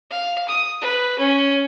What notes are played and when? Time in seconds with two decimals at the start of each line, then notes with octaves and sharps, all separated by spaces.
0.10 F5
0.48 D#6
0.81 B4
1.19 C#4